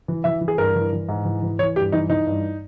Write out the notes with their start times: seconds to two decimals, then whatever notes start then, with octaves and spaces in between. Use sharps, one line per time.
0.08 E3
0.24 E3 E5
0.41 E3
0.48 G#4
0.58 G2 A#4
0.75 E3
0.92 E3
1.09 G#2
1.25 E3
1.42 E3
1.59 E3 C#5
1.76 G2 G4
1.92 E3 D#4
2.09 E3 D#4
2.27 G2